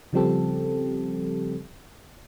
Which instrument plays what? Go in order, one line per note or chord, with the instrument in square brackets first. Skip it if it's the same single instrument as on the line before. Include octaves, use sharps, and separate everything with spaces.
[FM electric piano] C#3 F3 G3 C4 G4 A4